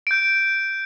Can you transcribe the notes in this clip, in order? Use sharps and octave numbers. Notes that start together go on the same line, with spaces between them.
G6 D7